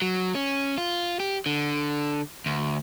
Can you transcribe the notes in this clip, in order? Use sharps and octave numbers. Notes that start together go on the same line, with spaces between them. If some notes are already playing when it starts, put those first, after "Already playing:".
F#3
C#4
F4
G4
D3
D2